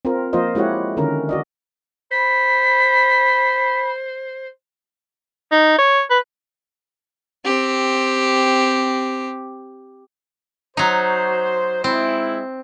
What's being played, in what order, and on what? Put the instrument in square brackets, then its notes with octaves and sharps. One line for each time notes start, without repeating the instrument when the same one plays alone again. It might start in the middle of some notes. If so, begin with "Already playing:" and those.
[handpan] C4 F4 A#4
F3 A#3 F4 A#4 C5 D#5
G#3 E4 F#4 G4 C#5 F#5
D3 D#3 C#4 A#4
F#4 D5 D#5
[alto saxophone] C5 [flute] B5 [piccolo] B6
[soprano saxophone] D#4
C#5
B4
[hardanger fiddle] C4 G4
[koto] F#3 D#4 [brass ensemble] C5
[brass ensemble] G#3 E4 [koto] C4